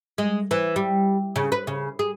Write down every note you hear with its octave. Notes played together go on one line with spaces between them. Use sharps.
G#3
E3
G3
C#3
B4
C#3
G#4